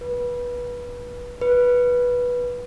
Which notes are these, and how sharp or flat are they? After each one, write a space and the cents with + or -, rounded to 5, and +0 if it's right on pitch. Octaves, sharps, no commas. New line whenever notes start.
B4 -20
B4 -10